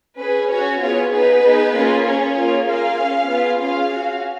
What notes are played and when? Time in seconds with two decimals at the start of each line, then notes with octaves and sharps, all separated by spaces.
0.18 C#4 G#4 B4
0.49 C#4 F#4 C#5
0.80 B3 F4 G#4 C#5
1.11 B3 D#4 G#4 B4
1.42 B3 D#4 G#4
1.74 A#3 C#4 F4 G#4
2.04 C#4 G#4 C#5
2.36 A#3 F4 G#4
2.67 A#3 F4 G#4 F5
2.99 C#4 G#4
3.29 B3 F4 G#4
3.60 C#4 F4 G#4 F5
3.92 C#4 F#4